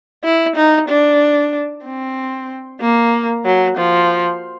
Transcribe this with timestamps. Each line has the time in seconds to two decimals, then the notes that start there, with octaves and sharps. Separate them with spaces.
0.24 E4
0.56 D#4
0.89 D4
1.84 C4
2.81 A#3
3.45 F#3
3.77 F3